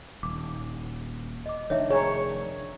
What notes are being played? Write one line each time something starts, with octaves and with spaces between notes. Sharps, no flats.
D#1 D6
D#5 D6
F1 D#3 D4 C#5 E5
G#4 C#5 G#5 A#5